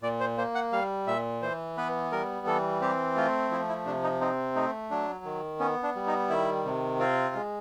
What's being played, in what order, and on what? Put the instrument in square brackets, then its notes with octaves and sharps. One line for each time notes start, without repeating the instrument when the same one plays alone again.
[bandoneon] A#2 D5
C5
A#3 C5
F#5
G3 F5
A#2 E5
E3 C5
B3 B4
G3 A#4
E3 A4
C4 G4
A3 F4
F3 E4
E4
C3 D4
D#4
C4 D#4
A3 D#4
F#3 D4
D#3
B3 C#4
D4
G3
D#4
D#3 E4
C3
C4 F4
G#3